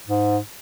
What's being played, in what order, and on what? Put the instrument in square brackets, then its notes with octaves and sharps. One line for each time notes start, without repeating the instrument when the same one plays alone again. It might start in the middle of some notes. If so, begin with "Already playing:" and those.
[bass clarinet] G#2